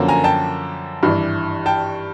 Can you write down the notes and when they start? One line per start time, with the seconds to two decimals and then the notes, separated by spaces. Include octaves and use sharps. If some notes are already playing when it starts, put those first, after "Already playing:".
Already playing: F#2 D3 F3 A#3 C#4
0.08 G#5 A#5
0.24 G5 A5
1.03 G#1 G2 E3
1.66 G5 A5